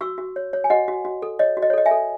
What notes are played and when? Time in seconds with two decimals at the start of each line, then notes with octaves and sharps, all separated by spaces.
0.01 F#4 C#6 E6
0.18 F#4
0.36 C#5
0.53 C#5
0.64 G#5
0.70 F#4 D#5 F#5
0.88 F#4
1.05 F#4
1.22 A4
1.39 C#5 D#5
1.57 F#4
1.62 D#5
1.70 C#5
1.73 A4 D#5
1.86 E5 G#5
1.91 A4